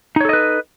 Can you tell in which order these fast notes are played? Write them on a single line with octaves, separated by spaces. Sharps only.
D#4 C#5 A4 D#5 B4